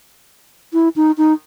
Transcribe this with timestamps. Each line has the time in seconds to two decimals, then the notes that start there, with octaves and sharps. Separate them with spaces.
0.73 E4
0.96 D#4
1.18 D#4